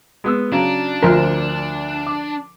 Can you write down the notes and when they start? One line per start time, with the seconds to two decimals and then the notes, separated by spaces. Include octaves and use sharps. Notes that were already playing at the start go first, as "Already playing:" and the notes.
0.24 G#3 B3 E6
0.52 C#3 F#3 D4 A#5
1.03 D2 F3 A#4
2.07 D6